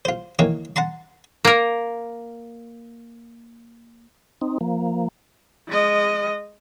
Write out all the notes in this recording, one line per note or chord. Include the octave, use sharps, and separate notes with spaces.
F4 C5
D#3 E3 A#3 A#4 C#5
F#5 A5 A#5 C6
A#3 A#4
C4 D#4
F3 A#3
G#3 D#5